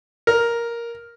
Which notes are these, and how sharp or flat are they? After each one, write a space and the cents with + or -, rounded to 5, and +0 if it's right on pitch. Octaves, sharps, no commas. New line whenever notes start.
A#4 +5